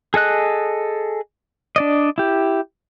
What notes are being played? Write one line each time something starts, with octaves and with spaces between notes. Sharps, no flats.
G#4 A4 D#5 F#6
D4 D5 D#5
E4 G4